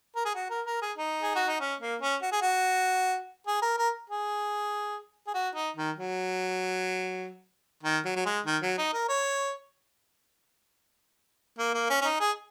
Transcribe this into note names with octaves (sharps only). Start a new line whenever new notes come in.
A#4
G#4
F#4
A#4
A#4
G#4
D#4
G#4
F#4
D#4
C#4
A#3
C#4
F#4
G#4
F#4
G#4
A#4
A#4
G#4
G#4
F#4
D#4
D#3
F#3
D#3
F#3
F#3
G#3
D#3
F#3
D#4
A#4
C#5
A#3
A#3
C#4
C#4
D#4
G#4